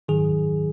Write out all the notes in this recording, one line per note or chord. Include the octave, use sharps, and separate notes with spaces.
G#2 D#3 F#3 G#4